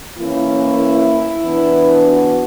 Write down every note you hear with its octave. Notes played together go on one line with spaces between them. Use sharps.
E3 A#3 C#4 E4
E3 B3 D4
F#4